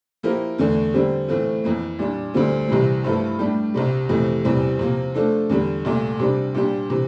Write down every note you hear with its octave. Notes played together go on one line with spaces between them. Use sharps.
F3 A#3 E4 G4 A#4
E2 D3 A3
D3 G3 C4 G4
A2 E3 A3 C4 F4
F2 E3 A#3
A#2 G3 D4
D2 D3 G3 C4 F4
C2 C3 E3 G3
G2 F3 A3 E4 A4
A2 G3 D4 G4
C2 C3 G3
F2 C3 E3 A3
E2 C3 E3 G3 C4
C3 F3 A#3
F3 A3 D4 A4
E2 D3 G3
C2 A#2 A3
C3 G3 D4
A#2 G3 D4 G4
C3 E3